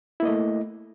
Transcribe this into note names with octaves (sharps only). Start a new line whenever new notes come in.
A3 A#3 E4 D#5